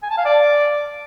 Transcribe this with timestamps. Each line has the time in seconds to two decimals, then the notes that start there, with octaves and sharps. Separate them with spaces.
0.03 G#5
0.10 A5
0.18 F5
0.25 D5